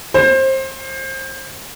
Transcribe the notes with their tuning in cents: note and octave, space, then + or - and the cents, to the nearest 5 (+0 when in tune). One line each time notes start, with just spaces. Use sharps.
C5 +25